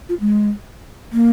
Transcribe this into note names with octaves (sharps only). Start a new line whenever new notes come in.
F4
G#3
A#3